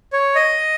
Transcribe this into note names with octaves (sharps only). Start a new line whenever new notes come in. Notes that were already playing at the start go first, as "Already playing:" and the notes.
C#5
D#5